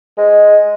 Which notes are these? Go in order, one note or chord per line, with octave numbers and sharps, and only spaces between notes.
G#3